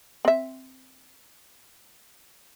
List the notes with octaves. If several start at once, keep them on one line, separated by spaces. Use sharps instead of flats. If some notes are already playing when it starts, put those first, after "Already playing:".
C4 E5